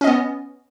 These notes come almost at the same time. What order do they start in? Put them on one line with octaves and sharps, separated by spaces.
C#4 D#5 B3